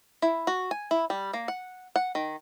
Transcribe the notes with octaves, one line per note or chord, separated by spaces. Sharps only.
E4
F#4
G#5
E4
G3
A#3
F#5
F#5
D#3